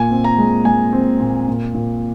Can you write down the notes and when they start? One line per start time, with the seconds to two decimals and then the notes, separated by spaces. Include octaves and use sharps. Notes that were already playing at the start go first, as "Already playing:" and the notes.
Already playing: A#2 G#5
0.11 C4
0.24 A#5
0.38 G#3
0.65 G#3 G#5
0.93 C4
1.20 A#2
1.48 A#2
1.74 A#2